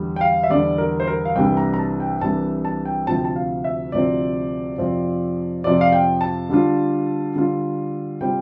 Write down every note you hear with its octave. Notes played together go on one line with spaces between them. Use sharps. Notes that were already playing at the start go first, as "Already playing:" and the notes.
Already playing: E2 D3 G3
G5
F5
E5
E2 D3 G3 D5
A#4
C5
A#4
F5
C2 C3 E3 G3 D4 G5
A#5
A#5
A5
G5
C2 C3 E3 G3 D4 A5
A5
G5
D2 C3 F3 C4 A5
G5
A5
F5
E5
D2 C3 F3 C4 D5
F2 C3 F3 C4 F4
F2 C3 F3 C4 F4 D5
F5
G5
A5
D3 G3 D4 F4
D3 G3 D4 F4
C3 G3 C4 F4 G5